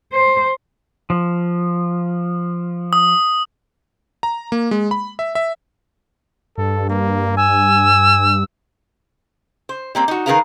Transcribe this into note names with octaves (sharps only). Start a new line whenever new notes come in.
C5
F3
D#6
A#5
A#3
G#3
B5
E5
E5
G2 A4
A#3
G#5 E6
C5
G3 A#3 C4
D#4 F#4
D#3 G#4 A#4 B4 F5 A#5